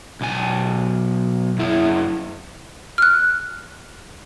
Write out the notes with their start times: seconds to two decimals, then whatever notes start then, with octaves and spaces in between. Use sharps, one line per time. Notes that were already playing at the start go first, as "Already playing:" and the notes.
0.21 B1 G#5
1.58 F#2 E4
2.98 F6 F#6